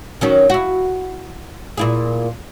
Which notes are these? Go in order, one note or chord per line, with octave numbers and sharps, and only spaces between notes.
D#3 F#3 C#4
E4 F#4
A#2 E4 G#4